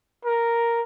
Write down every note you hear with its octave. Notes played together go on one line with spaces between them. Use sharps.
A#4